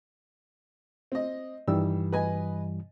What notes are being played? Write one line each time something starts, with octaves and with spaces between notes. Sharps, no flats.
C4 D#5
G2 D#3 E3 G3 E6
B4 D#5 G#5